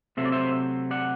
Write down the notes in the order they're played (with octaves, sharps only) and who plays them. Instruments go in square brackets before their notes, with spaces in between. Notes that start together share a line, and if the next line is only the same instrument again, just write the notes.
[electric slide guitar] C3 F#3 A3 C4 E5
D5
C5 E5
D5 F#5